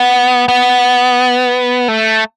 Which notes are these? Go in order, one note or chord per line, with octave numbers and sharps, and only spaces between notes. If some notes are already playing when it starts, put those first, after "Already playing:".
Already playing: B3
B3
A3